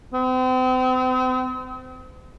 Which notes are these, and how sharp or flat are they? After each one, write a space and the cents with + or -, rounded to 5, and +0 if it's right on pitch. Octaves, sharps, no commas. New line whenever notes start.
C4 -40